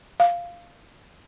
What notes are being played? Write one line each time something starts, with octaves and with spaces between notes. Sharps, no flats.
F5